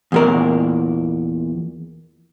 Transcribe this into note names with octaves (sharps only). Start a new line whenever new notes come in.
E2 A#2 A#4